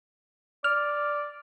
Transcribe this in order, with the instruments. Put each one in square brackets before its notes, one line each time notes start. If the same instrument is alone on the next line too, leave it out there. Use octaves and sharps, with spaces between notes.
[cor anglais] D5 [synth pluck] F6